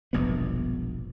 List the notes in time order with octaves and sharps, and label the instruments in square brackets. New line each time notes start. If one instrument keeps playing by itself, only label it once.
[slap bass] E1 A#1 G2 B3